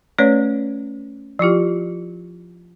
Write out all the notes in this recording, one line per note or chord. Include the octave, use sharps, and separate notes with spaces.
A3 C#4 B4 C#5 D5
F3 E4 F4 G4